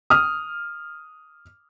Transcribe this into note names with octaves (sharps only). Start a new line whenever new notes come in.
D#6 F6